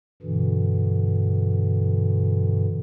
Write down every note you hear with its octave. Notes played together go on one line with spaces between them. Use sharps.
G2 B2 D3 E3